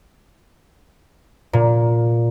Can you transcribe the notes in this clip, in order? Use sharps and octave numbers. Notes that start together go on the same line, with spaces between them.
A#2